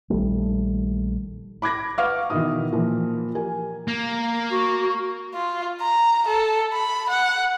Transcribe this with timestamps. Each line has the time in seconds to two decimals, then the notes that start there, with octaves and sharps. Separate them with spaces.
0.10 A#1 D#3 G3 A3
1.62 B5 D6 F#6 G#6 A#6
1.98 B4 F5 F#5 C#6 D6 F6
2.30 B2 D#3 E3 E4 D#6
2.72 A#2 E3 F3
3.35 G4 A#4 G#5
3.88 A#3
4.49 F#4
5.34 F4
5.81 A#5
6.28 A4
6.73 B5
7.09 F#5